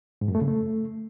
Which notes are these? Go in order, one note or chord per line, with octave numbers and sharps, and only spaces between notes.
G#2
F#2
A3
C#3
A3